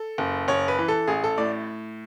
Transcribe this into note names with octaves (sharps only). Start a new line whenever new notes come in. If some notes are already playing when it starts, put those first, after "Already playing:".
Already playing: A4
F#1
F#1 C#5
B4
E3
A4
A1 G#4
A4
A2 D5